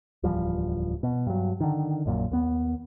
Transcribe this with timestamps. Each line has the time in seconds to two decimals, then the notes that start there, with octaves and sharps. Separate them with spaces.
0.23 D1 E2 F3 G3
1.03 B2
1.27 G2 F#3
1.60 D3 D#3
2.06 A#1 F#2 A#2
2.31 D#2 B3